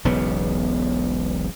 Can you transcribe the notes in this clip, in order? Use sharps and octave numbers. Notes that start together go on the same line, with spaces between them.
E1 B1 C#3 B3